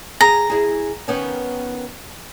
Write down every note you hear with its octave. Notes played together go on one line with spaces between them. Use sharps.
G#4 A#5
E4 G#4
D#3 B3 C#4